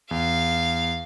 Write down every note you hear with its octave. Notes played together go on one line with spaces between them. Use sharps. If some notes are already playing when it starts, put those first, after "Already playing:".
E2 F5